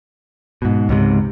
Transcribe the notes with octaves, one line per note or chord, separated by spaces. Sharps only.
G#2 B2
C#2 G#2 C3